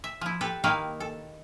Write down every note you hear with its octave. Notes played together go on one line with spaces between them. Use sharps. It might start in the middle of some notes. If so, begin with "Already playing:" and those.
E5
F3 E4
G4 A4 B4
D#3 A#3 E4 B4 F5 G5
A4